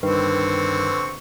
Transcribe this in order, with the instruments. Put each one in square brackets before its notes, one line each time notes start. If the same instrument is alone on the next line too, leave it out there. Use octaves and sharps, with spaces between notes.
[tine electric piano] G2 D#3 [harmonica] D3 C4 C#6 [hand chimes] B4